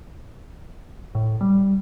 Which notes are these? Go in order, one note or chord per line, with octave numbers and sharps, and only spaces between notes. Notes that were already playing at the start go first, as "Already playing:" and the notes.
A2
G3